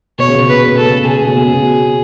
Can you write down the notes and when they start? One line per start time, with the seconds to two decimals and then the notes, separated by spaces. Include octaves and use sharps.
0.18 B2 C#5
0.27 C#3
0.35 B2
0.44 C#3
0.48 B2 B4
0.61 C#3
0.68 B2
0.77 C#3 A4
0.85 B2
0.94 C#3
1.02 B2
1.06 C#3 G#4
1.19 B2
1.27 C#3
1.36 B2
1.43 C#3
1.53 B2